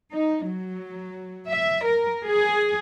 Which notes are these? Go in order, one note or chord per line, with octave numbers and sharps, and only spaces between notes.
D#4
F#3
E5
A#4
G#4